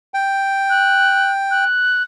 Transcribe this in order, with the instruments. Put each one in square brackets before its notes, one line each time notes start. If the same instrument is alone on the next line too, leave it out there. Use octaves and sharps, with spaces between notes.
[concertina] G5
[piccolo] F#6
F#6